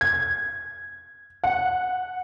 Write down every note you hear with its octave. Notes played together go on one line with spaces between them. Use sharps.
G#6
F#5